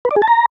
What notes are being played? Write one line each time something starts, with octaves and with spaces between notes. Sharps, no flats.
B4
D5
G#4
A5
A#5